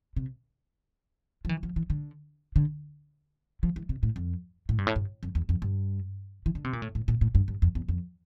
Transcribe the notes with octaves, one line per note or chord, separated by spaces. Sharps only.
C3
F3
E3
F3
E3
D3
D3
F3
E3
C3
A2
F2
A2
G2
A2
G2
F2
E2
F2
G2
E3
D3
C3
A#2
A2
A2
A#2
A2
G2
G2
F2
E2
F2